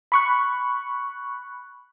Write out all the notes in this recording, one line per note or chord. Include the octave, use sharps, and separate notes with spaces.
B5 C#6 F#6